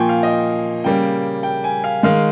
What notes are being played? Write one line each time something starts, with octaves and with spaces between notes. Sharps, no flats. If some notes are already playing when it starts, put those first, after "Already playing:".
Already playing: A#2 F3 A#3 G5 G#5 C#6
F5
D#5
C#3 G3 A#3 G5
G5
G#5
F5
D#3 G#3 F5